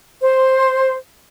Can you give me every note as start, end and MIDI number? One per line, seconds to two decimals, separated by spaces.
0.21 0.94 72